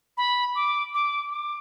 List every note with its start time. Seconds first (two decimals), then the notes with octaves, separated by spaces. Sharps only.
0.17 B5
0.55 D6
0.94 D6
1.32 D6